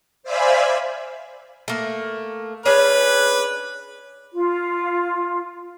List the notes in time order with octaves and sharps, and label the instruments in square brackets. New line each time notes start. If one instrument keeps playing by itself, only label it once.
[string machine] C5 D5 E5 F5 G#5 B5
[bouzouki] A3 A#3
[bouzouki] C#4 D4 G#4 [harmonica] B4
[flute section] F4